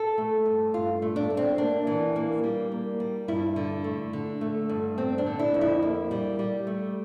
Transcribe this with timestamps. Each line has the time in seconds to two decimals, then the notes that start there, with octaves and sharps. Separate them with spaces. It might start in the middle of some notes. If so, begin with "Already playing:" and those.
Already playing: A4
0.18 A3
0.46 G2
0.74 G2 F4
1.02 A3
1.16 D4
1.30 A3
1.37 C4
1.58 A#3 D4
1.87 E3
2.16 A#3
2.44 G3
2.72 A#3
3.00 G3
3.28 G2 E4
3.56 D3
3.84 A3
4.13 D3
4.41 A3
4.69 G2
4.98 G3 C4
5.18 D4
5.26 D3
5.39 E4
5.54 F2
5.61 E4
5.82 A#3
6.11 G3
6.39 G3
6.67 A3